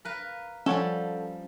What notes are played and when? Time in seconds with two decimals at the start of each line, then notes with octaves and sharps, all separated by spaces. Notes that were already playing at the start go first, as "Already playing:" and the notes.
0.05 A#4 B4 F5
0.66 F3 G3 C#4 A4 C#5 F#5 G5